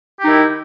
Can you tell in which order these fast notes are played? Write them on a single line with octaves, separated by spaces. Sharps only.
G4 D#4 D#3 E4